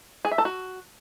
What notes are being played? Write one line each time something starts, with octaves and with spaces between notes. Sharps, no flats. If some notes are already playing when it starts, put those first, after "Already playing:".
G#4
E5
A4
F#4